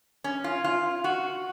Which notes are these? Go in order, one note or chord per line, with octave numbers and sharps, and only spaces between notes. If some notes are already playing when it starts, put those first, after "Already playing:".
C#4
F4
F4
F#4